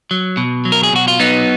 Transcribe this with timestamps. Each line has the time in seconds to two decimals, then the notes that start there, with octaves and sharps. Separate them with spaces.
0.11 F#3
0.37 B2
0.65 F#3
0.72 A#4
0.83 G#4
0.93 B2 F#4
1.08 F4
1.20 F#3 B3 D#4